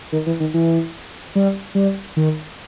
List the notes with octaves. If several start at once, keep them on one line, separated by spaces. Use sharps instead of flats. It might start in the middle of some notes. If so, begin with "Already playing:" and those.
D#3
E3
D#3
E3
G3
G3
D#3